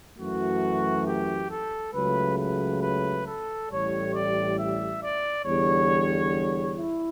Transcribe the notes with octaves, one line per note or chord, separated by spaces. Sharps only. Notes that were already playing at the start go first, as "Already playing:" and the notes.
F#2 E3 A3 F#4
G4
A4
C#2 C#3 F#3 A3 B4
B4
B4
A4
A1 A2 G3 C#5
D5
E5
D5
E2 D3 G3 C#5
E4